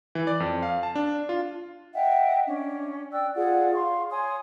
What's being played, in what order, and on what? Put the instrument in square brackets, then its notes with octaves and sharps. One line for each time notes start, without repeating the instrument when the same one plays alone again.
[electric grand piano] E3
D5
F2
F5
A5
D4
F4
[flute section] D#5 E5 F#5 G5
C#4 D4
D5 G5 E6 F#6
F4 G#4 D5 F#5
F5 C6 C#6
C#5 G#5 C6 D#6